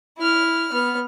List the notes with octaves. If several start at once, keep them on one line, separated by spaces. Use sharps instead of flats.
E4 F6
B3 F6